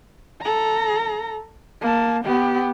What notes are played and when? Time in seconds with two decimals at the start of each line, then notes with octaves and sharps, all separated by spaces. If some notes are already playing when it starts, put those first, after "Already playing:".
0.42 A4 A#5
1.81 A#3 A5
2.24 B3 G4